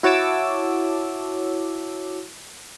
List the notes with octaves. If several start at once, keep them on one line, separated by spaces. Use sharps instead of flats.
E4 F#4 C#5 A5 D6 E6